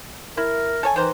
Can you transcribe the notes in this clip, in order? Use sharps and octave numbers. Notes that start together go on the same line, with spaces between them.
E4 A#4
A4 C#5 G#5
D#3 E3 C5 A#5